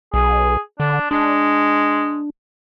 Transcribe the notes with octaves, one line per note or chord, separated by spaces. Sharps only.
B1 G#4
D3 D4
G#3 D4